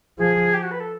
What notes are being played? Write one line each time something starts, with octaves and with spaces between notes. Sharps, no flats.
F3 G#4
G4
F#4
B4
A4